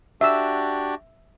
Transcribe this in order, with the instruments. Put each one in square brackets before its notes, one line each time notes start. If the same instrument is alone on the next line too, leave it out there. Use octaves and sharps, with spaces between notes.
[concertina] D4 F#4 G4 [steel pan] E5 E6